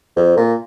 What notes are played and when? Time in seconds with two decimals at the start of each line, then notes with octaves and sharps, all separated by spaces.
0.16 F2
0.37 A#2